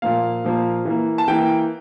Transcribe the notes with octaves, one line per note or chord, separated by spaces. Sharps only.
A#2 F3 A#3 F5
A#2 F3 A#3
E3 A#3
A5
E3 A#3 G5